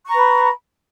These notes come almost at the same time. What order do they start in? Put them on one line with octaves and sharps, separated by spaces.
C#6 A#5 B4 B5